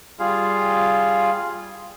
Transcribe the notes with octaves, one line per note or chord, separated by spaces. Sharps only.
G3 F4 G#4 F5